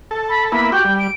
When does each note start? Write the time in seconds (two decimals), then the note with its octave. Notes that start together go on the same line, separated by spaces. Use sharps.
0.11 A4
0.29 B5
0.52 A#3 B3 E4 B5
0.72 F#4 G4 G5
0.85 G3
0.99 D7